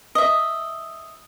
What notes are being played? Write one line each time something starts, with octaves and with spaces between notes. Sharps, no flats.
D#5 E5